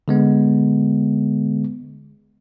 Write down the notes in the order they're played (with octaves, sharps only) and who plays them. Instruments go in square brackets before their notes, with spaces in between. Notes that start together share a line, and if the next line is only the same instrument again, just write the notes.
[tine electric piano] D3 G#3 B3